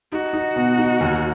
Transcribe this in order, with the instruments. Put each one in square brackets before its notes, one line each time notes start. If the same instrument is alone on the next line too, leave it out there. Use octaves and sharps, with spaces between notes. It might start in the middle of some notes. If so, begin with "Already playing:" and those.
[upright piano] D#4 [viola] F#4
[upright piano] D#4
B2
D#4
D#2